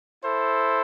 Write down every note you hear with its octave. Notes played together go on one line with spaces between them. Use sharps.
E4 A4 C5